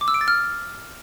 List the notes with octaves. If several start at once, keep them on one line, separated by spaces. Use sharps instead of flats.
D6
E6
D7
A6
F6